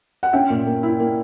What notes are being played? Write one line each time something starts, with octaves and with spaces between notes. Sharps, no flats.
F#5
C#4 E5 G5
A#2
A#3
E4
A#3